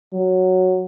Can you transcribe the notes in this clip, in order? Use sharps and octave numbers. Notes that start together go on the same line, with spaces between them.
F#3